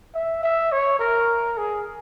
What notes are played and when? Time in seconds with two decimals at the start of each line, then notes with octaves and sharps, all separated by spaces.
0.15 E5
0.43 E5
0.72 C#5
0.99 A#4
1.57 G#4